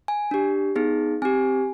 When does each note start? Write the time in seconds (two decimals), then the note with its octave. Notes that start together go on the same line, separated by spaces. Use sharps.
0.08 G#5
0.31 D4 G4
0.76 B3 D#4 G#4
1.22 C4 G4 G#5